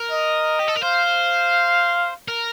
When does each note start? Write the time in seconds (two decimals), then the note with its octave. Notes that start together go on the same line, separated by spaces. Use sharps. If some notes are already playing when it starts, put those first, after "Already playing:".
Already playing: A#4
0.11 D#5
0.59 G4
0.68 A4
0.75 A#4
0.83 C5 F5
2.28 A#4